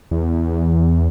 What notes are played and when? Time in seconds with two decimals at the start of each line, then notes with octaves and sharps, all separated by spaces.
0.11 E2